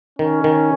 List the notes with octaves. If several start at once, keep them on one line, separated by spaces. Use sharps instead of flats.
D#3 C#4
D#3